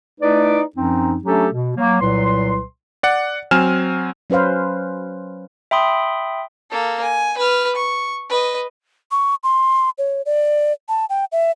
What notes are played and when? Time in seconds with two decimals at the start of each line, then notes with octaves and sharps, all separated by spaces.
0.21 A3 D#4 E4 B4 D5
0.76 F#2 F3 C4 D#4
1.24 F#3 A3 C#4 D4 G4 A4
1.53 B2
1.76 F#3 A#3
2.00 C2 A#2 F#3 B4 C6
3.03 D5 F#5
3.51 F#3 C4 G#5 F6 E7
4.30 F#3 C#4 B4 C5 F5
5.71 E5 G5 B5 C6 D#6
6.71 A#3 A4
7.02 G#5
7.37 B4 F6
7.75 C#6
8.29 B4 D#5
9.11 C#6
9.44 C6
9.98 C#5
10.26 D5
10.89 A5
11.10 G5
11.32 E5